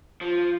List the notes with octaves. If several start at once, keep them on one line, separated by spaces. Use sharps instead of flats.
F3